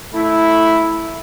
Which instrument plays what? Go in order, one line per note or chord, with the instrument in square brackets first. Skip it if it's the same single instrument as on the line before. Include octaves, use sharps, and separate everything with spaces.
[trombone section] A3 E4